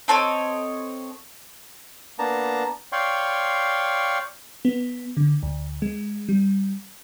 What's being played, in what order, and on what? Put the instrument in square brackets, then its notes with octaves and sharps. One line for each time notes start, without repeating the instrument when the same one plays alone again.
[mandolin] C4 A4 C#5 D#5
[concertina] A#3 B3 D4 A5 A#5
C#5 D5 F5 G5 C6 C#6
[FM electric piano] B3
D3
D2
G#3
G3